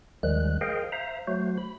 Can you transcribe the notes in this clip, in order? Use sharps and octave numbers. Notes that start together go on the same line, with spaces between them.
D#2 D#3 F3 G3 G#3 F#6
G#4 A#4 C5 D#5 F5 G5
C5 E5 F5 A#5
F#3 A3 F#4 C5
B5